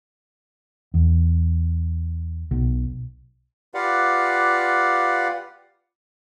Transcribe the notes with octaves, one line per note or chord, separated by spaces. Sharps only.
E2
B1
F4 G4 B4 D5 F5 F#5